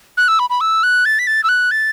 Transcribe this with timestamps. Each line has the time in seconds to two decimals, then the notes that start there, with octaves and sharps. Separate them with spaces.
0.17 F#6
0.28 E6
0.39 B5
0.50 B5
0.61 E6
0.83 F#6
1.05 A6
1.19 B6
1.27 A6
1.44 E6
1.49 F#6
1.71 A6